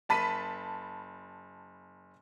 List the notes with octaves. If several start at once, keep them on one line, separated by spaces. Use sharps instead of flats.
F#1 A5 B5 B6 D#7